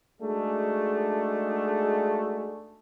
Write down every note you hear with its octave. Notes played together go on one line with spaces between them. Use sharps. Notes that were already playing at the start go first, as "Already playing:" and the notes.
G#3 A3 D4 D#4 F#4 G#4